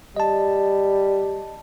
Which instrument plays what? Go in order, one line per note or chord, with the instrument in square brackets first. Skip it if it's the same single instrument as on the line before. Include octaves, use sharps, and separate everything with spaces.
[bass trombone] G3 [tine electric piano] D#5 A5